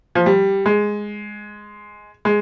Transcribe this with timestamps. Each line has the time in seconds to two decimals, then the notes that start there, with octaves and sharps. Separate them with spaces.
0.15 F3
0.26 G3
0.66 G#3
2.25 G#3